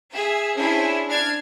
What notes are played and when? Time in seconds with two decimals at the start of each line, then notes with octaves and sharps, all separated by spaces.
0.13 G#4 E5
0.57 C#4 D4 E4 G#4 C5
1.09 D4 F6 G#6